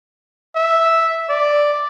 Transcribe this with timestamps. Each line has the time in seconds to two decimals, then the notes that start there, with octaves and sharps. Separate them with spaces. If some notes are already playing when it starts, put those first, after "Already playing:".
0.55 E5
1.29 D5